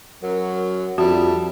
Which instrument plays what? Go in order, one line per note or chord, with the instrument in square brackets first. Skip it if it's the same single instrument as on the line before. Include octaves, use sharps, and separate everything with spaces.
[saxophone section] F#2 F#3 [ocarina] A#4
[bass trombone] F2 [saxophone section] G3 D4 E5 [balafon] F#4 [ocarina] A5